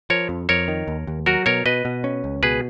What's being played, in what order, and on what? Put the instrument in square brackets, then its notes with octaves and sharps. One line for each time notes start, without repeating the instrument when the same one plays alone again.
[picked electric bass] F3 [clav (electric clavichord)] A#4 C#5
[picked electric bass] F2
[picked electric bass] F2 [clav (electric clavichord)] A#4 C#5
[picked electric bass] D#3
D#2
D#2
[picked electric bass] F#3 [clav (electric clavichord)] F#4 A#4
[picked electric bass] B2 [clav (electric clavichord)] A#4 C#5
[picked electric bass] B2 [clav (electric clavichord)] B4 D#5
[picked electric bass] B2
C#4
C#2
[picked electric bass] B2 [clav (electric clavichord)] G#4 B4